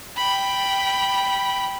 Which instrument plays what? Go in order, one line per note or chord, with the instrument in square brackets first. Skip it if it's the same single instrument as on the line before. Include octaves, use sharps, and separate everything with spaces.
[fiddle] G5 B5